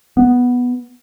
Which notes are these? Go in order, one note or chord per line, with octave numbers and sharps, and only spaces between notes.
B3